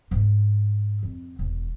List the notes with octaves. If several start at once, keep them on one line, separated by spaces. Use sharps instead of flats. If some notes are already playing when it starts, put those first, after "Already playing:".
G#2 A3
F2
E1